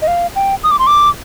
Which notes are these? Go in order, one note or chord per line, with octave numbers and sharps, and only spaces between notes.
D#5
F5
G5
D#6
D6
C6
D6